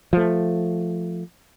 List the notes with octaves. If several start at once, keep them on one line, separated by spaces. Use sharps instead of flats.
F3 A3